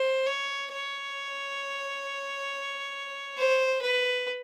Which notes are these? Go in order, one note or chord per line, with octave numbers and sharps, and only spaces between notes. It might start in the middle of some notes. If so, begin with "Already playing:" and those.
Already playing: C5
C#5
C#5
C5
B4